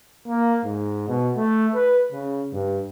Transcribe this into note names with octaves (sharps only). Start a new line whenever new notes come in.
A#3
G#2
B2
A3
B4
C#3
G2